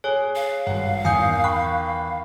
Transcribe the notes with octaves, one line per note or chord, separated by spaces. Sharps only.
G#4 C#5 F#6 G7
F5
G#1 G2 F#5
E2 D#3 G#5 D#6 G6
G5 B5 C#6 F#6